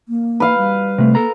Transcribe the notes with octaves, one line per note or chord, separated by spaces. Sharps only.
A#3
B4 F5
G3
C3 A3
A#3 A4 A#5